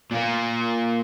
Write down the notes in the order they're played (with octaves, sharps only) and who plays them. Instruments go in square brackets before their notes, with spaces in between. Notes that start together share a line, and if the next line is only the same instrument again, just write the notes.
[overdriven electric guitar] A#2 A#3